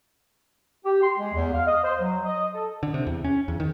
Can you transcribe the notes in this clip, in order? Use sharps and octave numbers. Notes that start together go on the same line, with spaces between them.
G4
C6
G#3
E2
F5
D#5
C5
F#3
D#5
A4
D3
C3
E2
C#4
E2
D#3